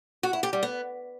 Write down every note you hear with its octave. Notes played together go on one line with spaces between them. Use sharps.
F#4
E4
G4
G3
B3